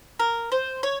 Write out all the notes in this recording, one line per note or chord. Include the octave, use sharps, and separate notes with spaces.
A#4
C5
C#5